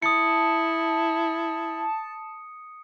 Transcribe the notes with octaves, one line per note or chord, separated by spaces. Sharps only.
E4 A5 D#6 C#7